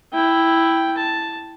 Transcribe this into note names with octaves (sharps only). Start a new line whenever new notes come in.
E4 G5
A5